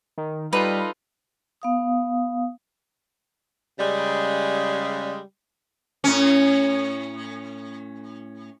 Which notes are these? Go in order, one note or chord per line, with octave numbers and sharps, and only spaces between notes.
D#3
G3 D#4 F4 A4 B4
B3 F5 D#6
C#3 G3 G#3
A2 C#4